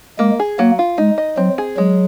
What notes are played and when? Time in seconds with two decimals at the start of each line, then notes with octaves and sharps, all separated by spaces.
0.19 G#3 A#3
0.40 G#4
0.59 F#3 A#3
0.79 F4
0.98 G#3 D#4
1.18 D#5
1.37 F#3 C4
1.58 G#4
1.77 F#3 G#3